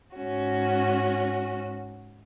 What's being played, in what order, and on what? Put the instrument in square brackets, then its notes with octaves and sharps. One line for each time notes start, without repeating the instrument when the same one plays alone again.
[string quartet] G#2 C#4 F#4